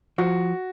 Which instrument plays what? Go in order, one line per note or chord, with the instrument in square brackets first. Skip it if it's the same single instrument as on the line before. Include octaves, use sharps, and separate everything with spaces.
[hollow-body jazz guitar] F3 [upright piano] F#4